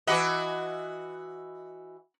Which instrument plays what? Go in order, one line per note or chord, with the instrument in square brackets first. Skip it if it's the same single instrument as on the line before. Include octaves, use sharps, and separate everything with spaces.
[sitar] E3 F#4 D#5 [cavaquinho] F#5 B5 D6